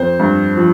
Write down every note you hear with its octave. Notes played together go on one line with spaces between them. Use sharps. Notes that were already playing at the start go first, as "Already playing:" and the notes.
Already playing: F2 C5
G2
F3